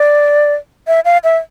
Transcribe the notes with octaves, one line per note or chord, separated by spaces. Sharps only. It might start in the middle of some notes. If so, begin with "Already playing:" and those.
Already playing: D5
E5
F5
E5